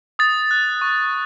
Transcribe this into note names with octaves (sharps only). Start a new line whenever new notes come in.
D#6 A6
F#6
C#6